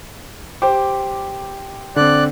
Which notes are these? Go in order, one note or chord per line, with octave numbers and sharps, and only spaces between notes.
G4 C5 G5 D6
D3 C4 D5 F#6